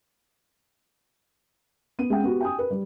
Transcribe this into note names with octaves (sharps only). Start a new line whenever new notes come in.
B3 D#7
G#3 C#4 F#5 G5
B3 F#4 G4
G5 G#5 D#6
A#4 B4
G3